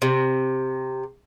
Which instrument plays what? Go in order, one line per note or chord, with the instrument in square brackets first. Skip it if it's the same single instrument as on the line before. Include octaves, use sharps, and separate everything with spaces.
[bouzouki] C3